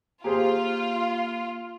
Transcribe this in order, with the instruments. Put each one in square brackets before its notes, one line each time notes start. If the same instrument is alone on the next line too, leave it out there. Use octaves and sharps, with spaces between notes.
[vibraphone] A#3 [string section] F4 [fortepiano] G4 G#4 C5